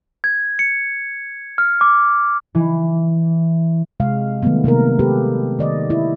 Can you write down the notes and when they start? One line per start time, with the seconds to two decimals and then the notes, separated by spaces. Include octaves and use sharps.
0.24 G#6
0.59 C#7
1.58 F6
1.81 D6
2.55 E3
4.00 C3 G#3 F5
4.43 D#3 F#3 G3 A3 B3
4.64 C3 A#3 B3 A#4
4.99 G#3 G4 A4 B4
5.59 D#3 D5 D#5
5.90 E4